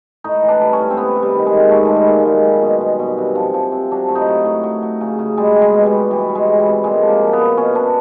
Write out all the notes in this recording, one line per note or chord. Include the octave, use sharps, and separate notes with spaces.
A2 D#4
E3
D4
G3
C#4
A2
C4
C3 B3
C3
G3
D#3
G#3
D#3
A#2 A3
A#2 G#3
G3
A#2
G#3
F#3
G3
B2
B2
B2
C3
F3
F3
C3
F#3 D4
A2
D#4
F#3
A2
F#3
F#3
C#3
C#3
G3 G#3
G3
G#3
B2
G3
B2
E3 G3
G3
G#3
E3
G3
C3
A#2 G#3
F3
A#3
F3
B3
A#2
B2 C#4
B2 D4